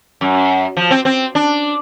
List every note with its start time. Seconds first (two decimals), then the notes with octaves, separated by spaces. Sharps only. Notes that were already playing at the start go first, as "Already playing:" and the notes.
0.21 F#2
0.77 F3
0.91 C4
1.05 C4
1.35 D4